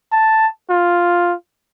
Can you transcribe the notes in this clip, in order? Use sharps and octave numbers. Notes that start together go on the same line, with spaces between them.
A5
F4